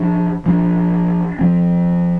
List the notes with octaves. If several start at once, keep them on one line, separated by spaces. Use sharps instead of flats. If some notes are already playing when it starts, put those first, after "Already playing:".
Already playing: F3 D4
F3 D4
F3 C4